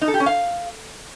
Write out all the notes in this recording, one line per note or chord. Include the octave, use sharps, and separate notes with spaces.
D#4
A4
G4
C#4
F5